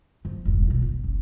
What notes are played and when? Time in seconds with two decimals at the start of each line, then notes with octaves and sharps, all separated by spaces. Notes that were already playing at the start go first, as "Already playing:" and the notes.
0.25 F3
0.45 E1 G2
0.67 B2 F4
0.82 F#1
1.04 C#4